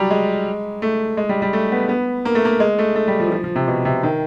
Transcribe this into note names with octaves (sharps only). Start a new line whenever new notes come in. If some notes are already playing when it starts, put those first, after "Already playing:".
Already playing: F#3 G3
G#3
A3
G#3
G3
G3
A3
B3
B3
A#3
A3
A#3
G#3
A3
A3
G3
F3
E3
F3
F3
C3
B2
C3
D#3